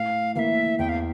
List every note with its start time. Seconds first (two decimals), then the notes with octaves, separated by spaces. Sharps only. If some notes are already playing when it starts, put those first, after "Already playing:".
Already playing: A2 F5
0.35 E3 A#3 E5 F5
0.79 E2 G5
0.89 F5